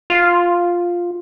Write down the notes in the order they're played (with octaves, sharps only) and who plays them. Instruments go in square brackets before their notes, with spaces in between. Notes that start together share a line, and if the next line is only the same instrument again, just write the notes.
[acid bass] F4